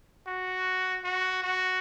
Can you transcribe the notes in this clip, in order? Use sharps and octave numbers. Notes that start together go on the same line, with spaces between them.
F#4
F#4
F#4